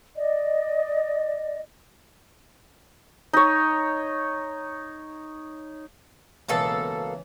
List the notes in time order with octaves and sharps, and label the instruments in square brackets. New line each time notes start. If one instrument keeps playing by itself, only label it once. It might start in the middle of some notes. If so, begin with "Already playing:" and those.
[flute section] D5 D#5
[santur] D#4 C#5
[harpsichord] C#2 E3 B5 [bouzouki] B2 A#3 A4